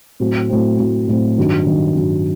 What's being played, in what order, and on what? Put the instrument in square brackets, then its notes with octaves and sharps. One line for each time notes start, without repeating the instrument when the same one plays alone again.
[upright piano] A2 F#3 C4
A2 F#3 C4
A2 F#3 C4
A2 F#3 C4
G2 D#3 F#3
G2 D#3 F#3
G2 D#3 F#3